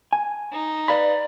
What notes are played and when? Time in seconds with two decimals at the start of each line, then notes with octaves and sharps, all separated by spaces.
0.13 G#5
0.52 D#4
0.88 B4 D5 F5 B5